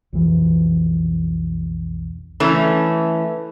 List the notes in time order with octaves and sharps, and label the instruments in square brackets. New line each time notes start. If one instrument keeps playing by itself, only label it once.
[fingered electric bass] B1 F2 E3
[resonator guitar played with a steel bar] E3 A3 C#4